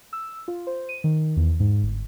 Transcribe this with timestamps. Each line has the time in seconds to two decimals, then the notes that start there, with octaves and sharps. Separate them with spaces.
0.13 E6
0.48 F4
0.67 C5
0.89 D#7
1.04 D#3
1.37 E2
1.60 G#2
1.82 G1